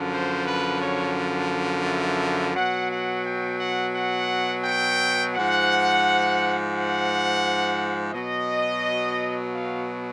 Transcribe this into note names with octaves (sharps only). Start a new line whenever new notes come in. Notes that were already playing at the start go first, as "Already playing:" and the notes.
Already playing: F#2 D3 F3
C5
B4
C#5
E5
B2 F#3 F#5
F#5
G5
F#5
F#5
G5
G#2 F3 F#5
F#5
B2 F#3 D#5
F5